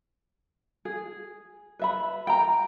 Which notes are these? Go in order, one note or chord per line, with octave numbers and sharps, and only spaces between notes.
G#4
B4 E5 B5
G5 A#5